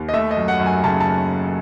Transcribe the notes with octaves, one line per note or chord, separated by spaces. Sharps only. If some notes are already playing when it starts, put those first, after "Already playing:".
Already playing: D#2
D#5
A3 E5
D#5
F#2
F#5
F#2
G#5
C#3 A5
A5